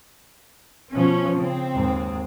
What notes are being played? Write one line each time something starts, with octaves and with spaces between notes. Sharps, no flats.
B2 F3 C#4
C#3 C4
D#2 G#2